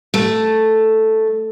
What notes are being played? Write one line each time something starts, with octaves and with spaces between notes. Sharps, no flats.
A3